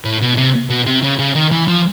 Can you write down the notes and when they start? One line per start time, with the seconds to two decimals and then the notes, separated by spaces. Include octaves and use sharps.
0.05 A2
0.21 B2
0.37 C3
0.70 B2
0.87 C3
1.03 C#3
1.19 C#3
1.35 D#3
1.52 E3
1.68 F3